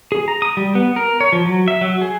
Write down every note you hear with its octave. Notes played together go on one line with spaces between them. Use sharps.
G#4
A#5
D#6
G3
B3
A#4
C#5
F3
F#3
E5
F#3
G#4